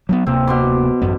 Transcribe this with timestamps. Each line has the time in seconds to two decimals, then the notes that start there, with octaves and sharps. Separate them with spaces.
0.09 F#3 A#3 B3
0.26 D1 C3 A#3 C4
0.47 B2 C6 D6
1.02 A1 F#2 B3